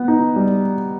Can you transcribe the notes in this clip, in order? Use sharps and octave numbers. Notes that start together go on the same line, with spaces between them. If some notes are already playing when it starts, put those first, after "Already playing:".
Already playing: B3
D#4
G3